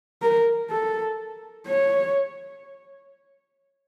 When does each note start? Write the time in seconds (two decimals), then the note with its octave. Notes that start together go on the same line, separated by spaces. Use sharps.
0.22 A#4
0.71 A4
1.67 C#5